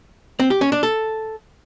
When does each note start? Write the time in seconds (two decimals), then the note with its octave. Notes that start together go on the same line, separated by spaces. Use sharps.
0.39 C4
0.50 G4
0.61 C#4
0.72 D4
0.83 A4